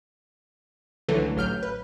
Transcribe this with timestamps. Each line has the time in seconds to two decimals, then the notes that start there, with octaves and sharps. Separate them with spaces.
1.08 C#2 D3 E3 F#3 A3
1.36 A1 F#3 F6 G6
1.63 B4